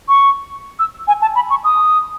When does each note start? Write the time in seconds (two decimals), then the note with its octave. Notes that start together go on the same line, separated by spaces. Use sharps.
0.08 C#6
0.79 E6
1.08 G#5
1.22 A5
1.35 B5
1.50 C#6
1.64 D#6